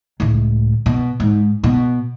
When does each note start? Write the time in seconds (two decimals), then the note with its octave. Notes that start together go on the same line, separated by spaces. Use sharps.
0.20 C#2 A2
0.86 B2
1.20 G#2
1.64 B2